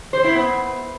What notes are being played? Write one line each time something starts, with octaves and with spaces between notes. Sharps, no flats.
C5
E4
B3